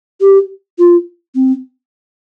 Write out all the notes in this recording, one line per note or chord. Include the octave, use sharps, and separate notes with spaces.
G4
F4
C4